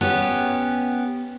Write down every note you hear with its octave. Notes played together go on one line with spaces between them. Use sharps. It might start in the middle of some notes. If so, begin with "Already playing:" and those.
B3 C#4 G4